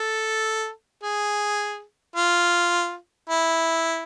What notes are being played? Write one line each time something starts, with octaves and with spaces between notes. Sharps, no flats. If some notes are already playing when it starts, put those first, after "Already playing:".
Already playing: A4
G#4
F4
E4